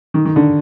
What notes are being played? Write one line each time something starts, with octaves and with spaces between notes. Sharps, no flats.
D#3
D#3
D3